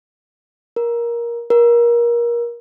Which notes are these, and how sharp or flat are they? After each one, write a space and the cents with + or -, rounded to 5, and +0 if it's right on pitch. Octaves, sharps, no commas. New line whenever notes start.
A#4 +15
A#4 +25